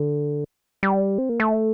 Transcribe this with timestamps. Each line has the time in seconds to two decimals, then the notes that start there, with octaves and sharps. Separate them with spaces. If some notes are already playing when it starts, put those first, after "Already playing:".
Already playing: D3
0.83 G3
1.18 C4
1.29 A#3
1.40 A3